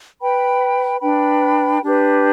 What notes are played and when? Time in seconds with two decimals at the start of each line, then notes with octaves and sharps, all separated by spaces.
0.22 B4 G5 B5
1.01 D4 B4 G5 B5
1.82 D4 G4 B4